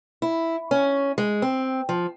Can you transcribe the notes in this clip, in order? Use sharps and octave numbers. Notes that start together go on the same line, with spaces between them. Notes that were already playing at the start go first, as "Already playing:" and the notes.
E4
C#4
G#3
C4
F3